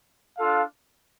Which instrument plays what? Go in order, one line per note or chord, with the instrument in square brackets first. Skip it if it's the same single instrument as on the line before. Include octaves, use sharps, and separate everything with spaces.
[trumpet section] D4 F4 A4 F5